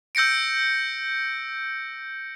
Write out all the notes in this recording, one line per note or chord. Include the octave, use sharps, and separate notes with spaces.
E6 G6 A#6 C#7 D7